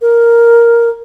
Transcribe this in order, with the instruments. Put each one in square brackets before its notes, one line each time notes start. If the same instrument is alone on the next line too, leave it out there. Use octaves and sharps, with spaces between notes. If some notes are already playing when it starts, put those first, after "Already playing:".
[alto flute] A#4